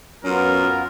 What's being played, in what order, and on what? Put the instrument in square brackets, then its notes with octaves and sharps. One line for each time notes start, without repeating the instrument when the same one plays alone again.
[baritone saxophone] F#2 [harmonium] B3 F4 [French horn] C#4 [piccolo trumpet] A#4